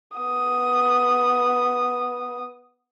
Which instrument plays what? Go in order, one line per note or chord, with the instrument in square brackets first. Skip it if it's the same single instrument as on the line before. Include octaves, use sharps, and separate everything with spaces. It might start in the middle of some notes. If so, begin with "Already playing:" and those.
[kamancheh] B3 D#6